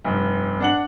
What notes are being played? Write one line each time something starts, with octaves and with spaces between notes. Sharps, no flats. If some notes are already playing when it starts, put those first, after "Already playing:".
F1 G2
D4 F#5 F#7